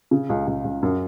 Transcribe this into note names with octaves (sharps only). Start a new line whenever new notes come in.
C#3
C#2
C#2
C#2
F#2